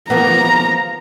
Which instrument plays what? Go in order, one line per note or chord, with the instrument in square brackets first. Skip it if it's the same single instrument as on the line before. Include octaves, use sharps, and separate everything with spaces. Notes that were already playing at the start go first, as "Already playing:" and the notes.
[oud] F3 A#3 B3 [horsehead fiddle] A#5